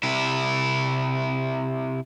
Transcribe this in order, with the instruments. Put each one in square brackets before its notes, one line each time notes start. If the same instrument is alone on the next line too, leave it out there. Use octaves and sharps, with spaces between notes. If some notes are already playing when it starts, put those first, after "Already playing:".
[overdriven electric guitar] C3 E4